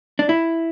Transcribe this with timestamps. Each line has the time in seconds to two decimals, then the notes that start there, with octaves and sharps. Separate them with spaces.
0.19 D4
0.29 E4